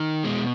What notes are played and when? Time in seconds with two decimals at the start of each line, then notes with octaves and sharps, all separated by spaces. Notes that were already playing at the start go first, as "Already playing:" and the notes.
Already playing: D#3
0.24 B2 G#3